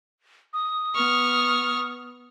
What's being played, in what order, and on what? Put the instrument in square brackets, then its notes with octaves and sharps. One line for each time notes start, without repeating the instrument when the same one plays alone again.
[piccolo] D#6
[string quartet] B3 C#6 F6